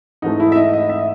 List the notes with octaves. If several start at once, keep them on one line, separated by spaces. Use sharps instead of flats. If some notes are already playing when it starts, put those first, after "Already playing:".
G#2 E3 A3 D#4
E4
E5
D#5
D#5
E5